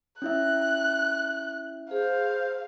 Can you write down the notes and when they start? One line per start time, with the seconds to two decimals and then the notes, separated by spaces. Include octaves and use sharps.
0.22 C#4 E4 E5 F#6
1.91 G#4 C5 F5